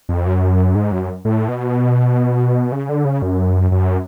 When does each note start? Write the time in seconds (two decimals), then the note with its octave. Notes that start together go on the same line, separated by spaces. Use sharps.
0.09 F2
0.26 F#2
0.75 G#2
0.92 F#2
1.25 A2
1.48 B2
2.72 C#3
2.89 D3
3.05 C#3
3.22 F#2
3.71 F#2